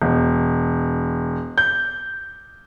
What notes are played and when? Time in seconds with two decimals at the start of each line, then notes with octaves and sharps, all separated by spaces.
0.02 E1
1.58 G6